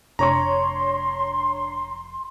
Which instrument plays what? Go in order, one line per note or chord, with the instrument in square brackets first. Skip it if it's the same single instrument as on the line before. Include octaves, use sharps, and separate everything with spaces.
[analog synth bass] F1 [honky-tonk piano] D4 C#5 C#6 [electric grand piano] A#5 [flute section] C6